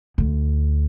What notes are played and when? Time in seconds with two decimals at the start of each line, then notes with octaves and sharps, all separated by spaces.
0.18 D2